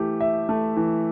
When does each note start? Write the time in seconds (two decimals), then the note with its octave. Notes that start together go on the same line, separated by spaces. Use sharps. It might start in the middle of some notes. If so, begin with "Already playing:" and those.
Already playing: E3 A3 G4
0.21 E5
0.49 A3
0.77 E3